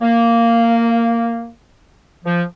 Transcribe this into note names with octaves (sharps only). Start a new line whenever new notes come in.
A#3
F3